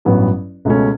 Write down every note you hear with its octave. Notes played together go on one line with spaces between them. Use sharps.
A1 G2 F#3 B3 F#4
C#2 B2 A3 C#4